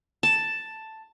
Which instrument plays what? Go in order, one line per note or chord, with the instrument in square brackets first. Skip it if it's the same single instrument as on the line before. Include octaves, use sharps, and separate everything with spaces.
[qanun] A5